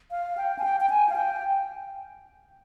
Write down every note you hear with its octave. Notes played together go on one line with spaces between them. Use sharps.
F5
G5
G#5
G5
G5
G#5
F5
G5